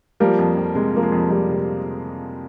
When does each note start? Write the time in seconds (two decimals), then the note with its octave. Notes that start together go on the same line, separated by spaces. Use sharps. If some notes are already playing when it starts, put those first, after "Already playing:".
0.20 F3 G3 A#3
0.39 F2
0.57 F2
0.75 C3 G#3
0.94 F3 A#3
1.03 G#3
1.12 F2
1.30 F2 G3
1.49 C3